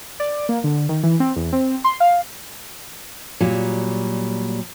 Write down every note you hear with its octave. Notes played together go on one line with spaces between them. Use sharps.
D5
A#3
D3
D#3
E3
C4
E2
C4
C6
F5
A#2 F#3 G3